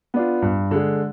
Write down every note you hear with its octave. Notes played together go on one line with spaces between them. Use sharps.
B3 D4 F4
G2
D3 G#3